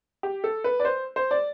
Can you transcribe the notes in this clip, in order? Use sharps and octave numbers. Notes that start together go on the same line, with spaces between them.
G4
A4
B4
D5
C5
C5
D5